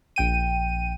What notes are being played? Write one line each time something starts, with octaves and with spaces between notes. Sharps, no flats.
A#1 G5 D#7